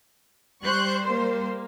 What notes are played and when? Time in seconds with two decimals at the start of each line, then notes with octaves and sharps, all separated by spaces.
0.63 G3 C5 C#6 F#6 G6
1.06 A#3